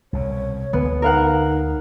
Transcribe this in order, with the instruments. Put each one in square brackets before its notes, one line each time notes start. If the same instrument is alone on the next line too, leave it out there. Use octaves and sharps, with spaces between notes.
[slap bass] C2 B2 [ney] C#5
[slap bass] D2 D3 G#3 [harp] B3
[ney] D#4 [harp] A#4 F5 F#5